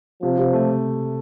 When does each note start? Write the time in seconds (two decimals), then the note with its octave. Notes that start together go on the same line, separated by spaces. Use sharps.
0.23 C3 F3
0.38 C3
0.53 A3